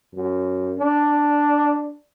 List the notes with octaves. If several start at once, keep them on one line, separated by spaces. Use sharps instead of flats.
F#2
D4